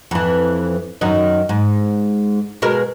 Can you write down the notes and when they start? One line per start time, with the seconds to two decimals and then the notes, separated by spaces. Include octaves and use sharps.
0.11 F2 E3
1.01 F#2 D#3 D#4
1.49 G#2
2.62 B2 G#3 A#4